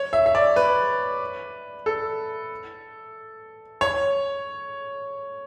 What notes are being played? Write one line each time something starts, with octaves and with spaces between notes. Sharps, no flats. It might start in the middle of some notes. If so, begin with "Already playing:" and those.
Already playing: C#5
E5
E5
D5
B4
A4
C#5